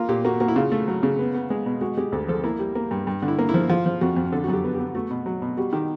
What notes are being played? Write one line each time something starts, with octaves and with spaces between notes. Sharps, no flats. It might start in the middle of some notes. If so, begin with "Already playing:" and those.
Already playing: A#3 F4
A#2 G4
A#3 F#4
A#3 F#4
E4
C#3 F4
A3
F#3
C#3
B3
B3
G#3
B2
G#3 F#4
G#3 G4
D2 A4
F3 A4
A#3 E4
G3
A#3
G2
G2
D3
E4
A#3
E4
F3
F3 F4
F3
F2 F#4
F2
D3 A4
F#4
F#2 G4
B3
B3 G4
A3 F#4
B2
F#3
B2
G3 F#4
D#3 G4